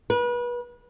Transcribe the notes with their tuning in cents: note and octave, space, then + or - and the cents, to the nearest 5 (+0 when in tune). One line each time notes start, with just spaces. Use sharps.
B4 -30